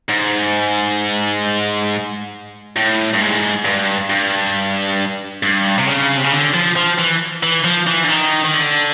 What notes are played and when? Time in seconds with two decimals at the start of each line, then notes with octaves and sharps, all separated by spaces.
0.09 G#2
2.77 A2
3.14 G2
3.21 G#2
3.65 G2
4.10 G2
5.43 G2
5.78 C3
5.87 C#3
6.17 C3
6.24 C#3
6.31 D3
6.54 F3
6.76 F3
6.98 E3
7.43 E3
7.64 F3
7.87 E3
8.04 D3
8.09 D#3
8.45 D#3
8.54 D3